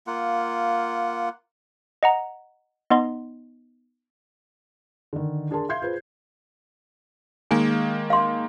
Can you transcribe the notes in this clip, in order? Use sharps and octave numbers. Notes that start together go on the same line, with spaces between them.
A#3 F4 F#5
D#5 F#5 A#5
B3 D#4 D#5 C6
D3 D#3
D4 G#4 A#4 A5 C6
E5 F5 C6 G6 G#6 C7
F4 G#4 B4 C5
D#3 G#3 A#3 G#5
F5 C6